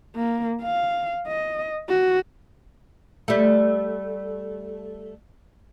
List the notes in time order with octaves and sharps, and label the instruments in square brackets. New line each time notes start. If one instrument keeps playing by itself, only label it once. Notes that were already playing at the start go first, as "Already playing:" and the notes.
[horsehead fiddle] A#3
F5
D#5
F#4
[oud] G3 A3